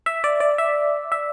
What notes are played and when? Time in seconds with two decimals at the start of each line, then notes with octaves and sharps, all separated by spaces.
0.06 E5
0.24 D5
0.40 D5
0.58 E5
1.12 E5